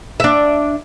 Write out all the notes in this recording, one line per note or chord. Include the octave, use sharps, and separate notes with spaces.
D4 E5